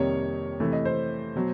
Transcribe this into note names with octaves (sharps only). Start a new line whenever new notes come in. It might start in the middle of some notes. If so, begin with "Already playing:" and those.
Already playing: F2 C3 D#3 G3 A#3 C#5
C3 E3 A3
D#5
C5
B2 F#3